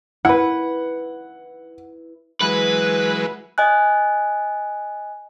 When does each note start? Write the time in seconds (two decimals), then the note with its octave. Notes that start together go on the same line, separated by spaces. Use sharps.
0.25 E4 B4 F#5
2.41 E3 F#3 G#3 B4
3.58 D#5 G#5 F#6